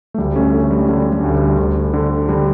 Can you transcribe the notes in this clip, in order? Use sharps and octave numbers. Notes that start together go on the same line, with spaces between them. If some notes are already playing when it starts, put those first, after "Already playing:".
A3
D2 G3
A3 C#4
D3
G3
D3 G3
G3
D2
G3
D2
D3
D3 G3